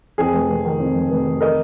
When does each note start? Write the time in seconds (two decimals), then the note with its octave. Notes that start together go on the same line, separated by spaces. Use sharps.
0.18 F2 G#4
0.33 F1
0.49 F1
0.65 D#3
0.80 F2
0.95 F1
1.10 F1
1.26 D#3
1.40 A#4 D#5